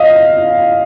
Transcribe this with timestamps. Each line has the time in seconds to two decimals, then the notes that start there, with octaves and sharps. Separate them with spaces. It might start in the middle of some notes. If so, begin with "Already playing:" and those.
Already playing: D#5 F5